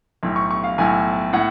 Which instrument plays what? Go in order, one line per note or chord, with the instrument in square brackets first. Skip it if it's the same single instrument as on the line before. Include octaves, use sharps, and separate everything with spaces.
[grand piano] B1 A2
C#6
C#6
F5
B1 A2 G#5
A2 F#5